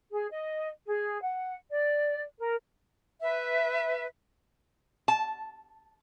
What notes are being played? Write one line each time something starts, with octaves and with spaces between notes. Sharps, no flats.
G#4
D#5
G#4
F#5
D5
A#4
B4 E5
A5